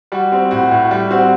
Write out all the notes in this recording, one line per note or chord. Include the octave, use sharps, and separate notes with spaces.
G3 F#4
C4
A2 F#4
A2
G3
C4 F#4